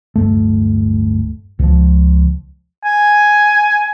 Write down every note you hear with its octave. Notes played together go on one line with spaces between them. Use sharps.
D1 G#1 G2 A3
C#2 F3
G#5